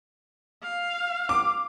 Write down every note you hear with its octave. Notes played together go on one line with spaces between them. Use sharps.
F5
D6